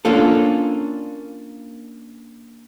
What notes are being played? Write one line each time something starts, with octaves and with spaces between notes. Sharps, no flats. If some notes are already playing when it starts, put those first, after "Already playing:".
A#3 C#4 D4 F4 A4